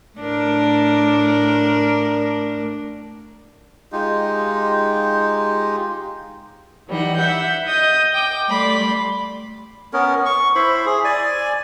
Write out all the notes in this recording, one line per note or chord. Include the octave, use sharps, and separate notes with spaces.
A2 D4 A#4
G#3 D#4 F4 G4
E3 G3 D#4 F#5
E5 F#5 G6
D#5 D#6 G6
G5 D6
G3 A3 D5 B5 C6
B3 C#4 A#4
C#6
E4 C5 B5
G#4
D5 G#5